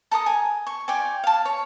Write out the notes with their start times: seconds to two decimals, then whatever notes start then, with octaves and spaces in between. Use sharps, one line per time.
0.11 A4 A#4 A#5 D#6
0.26 G#5
0.67 C#6
0.88 F4 D5 G5 G#5
1.24 F5 A5
1.45 C#5